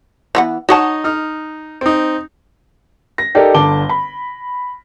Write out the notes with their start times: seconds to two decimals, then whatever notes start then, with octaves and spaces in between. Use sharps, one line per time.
0.35 E3 B3 F#5
0.69 D#4 F#4 C#5 D#5 F#5 A5
1.04 D#4 F6
1.81 C4 D#4
3.18 A#6
3.35 D#4 G4 A4 A#4 D5
3.54 G1 D3 A5 D6 G7
3.89 B5